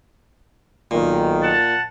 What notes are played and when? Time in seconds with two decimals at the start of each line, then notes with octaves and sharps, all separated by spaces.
0.91 B1 A#2 D#3
1.43 F#5 A5